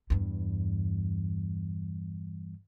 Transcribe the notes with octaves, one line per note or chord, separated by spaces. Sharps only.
E2 G2